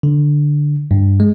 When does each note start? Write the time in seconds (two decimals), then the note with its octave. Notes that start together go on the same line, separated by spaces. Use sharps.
0.03 D3
0.91 G2
1.20 G#3